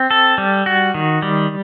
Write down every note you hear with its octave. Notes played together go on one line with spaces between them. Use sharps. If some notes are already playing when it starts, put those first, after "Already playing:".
Already playing: C4
A4
G3
F#4
D#3
G3